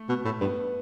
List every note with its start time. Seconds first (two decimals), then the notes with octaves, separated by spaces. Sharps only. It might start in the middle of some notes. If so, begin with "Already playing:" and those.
Already playing: A3
0.09 B2
0.25 A2
0.41 G2 B3